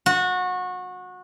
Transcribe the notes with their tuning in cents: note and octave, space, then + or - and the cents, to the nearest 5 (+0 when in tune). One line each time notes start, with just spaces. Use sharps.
F#4 -25